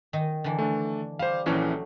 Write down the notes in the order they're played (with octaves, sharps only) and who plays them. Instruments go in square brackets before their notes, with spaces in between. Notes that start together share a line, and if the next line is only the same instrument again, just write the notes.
[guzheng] D#3 D#4
D3 E3
[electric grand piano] A3 D4
[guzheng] G3 [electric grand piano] C5 F5
[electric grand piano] A#1 E3 C#4 [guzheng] F#3 A3 G5